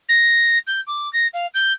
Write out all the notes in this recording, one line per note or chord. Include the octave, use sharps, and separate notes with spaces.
A#6
G6
D6
A#6
F5
G6